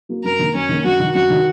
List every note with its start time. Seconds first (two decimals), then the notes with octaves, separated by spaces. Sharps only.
0.09 F#3 A#3
0.24 F#2 A#4
0.39 D#3 A#3
0.54 F#2 C#4
0.69 D#3 A#3
0.84 F#2 F#4
1.00 D#3 F#3
1.15 F#2 F#4
1.30 D#3 F#3